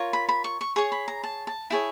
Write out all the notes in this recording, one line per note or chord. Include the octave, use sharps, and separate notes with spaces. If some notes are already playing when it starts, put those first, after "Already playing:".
Already playing: F4 A#4 C#5
B5
B5
C#6
C#6
G#4 C#5 C#6
B5
A#5
A5
A5
E4 G#4 C#5 G5